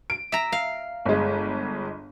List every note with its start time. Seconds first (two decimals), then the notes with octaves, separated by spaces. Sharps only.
0.10 D7
0.32 E5 A#5
0.52 F5
1.05 G1 G#3